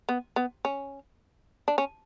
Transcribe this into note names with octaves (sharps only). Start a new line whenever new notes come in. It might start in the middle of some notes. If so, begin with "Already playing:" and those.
B3
B3
C#4
D4
C#4